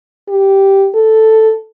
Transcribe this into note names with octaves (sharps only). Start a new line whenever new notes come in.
G4
A4